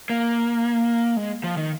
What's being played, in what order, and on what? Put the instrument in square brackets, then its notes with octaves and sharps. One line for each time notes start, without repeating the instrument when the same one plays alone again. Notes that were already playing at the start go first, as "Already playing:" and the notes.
[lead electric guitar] A#3
G#3
F3
D#3